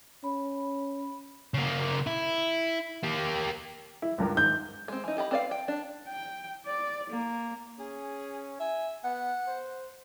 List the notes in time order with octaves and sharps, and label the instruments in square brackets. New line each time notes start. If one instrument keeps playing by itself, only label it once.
[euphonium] C#4 [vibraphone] B5
[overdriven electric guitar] C#3 A#3
E4
A#3 G4
[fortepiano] E4
C#2 G2 A#4
[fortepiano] G#2 D#3 [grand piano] G6
[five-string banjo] G#3 C4
E3 D#4
G4 D#5 B5
C4 B4 D5 D#5 F5
G5
D4
[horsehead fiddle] G5
D5
A#3
[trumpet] C#4 [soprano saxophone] G#4
[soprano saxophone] E5 [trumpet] G#5
[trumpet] B3 [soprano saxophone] F#5
[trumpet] C5